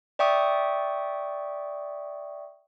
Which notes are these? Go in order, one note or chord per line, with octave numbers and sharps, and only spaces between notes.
D5 E5 G5 C#6 D#6